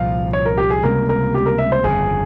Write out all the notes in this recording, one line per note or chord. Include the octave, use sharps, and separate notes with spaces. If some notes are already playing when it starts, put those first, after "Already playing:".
Already playing: C2 A#2 F3 F5
C#5
A#4
G4
G#4
C#2 C3 G3 A#3 A#4
A#4
G4
A#4
E5
C5
G1 F2 C#3 G#4